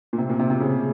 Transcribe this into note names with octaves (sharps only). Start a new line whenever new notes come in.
A#2
C3
A#2
C3
C3
C#3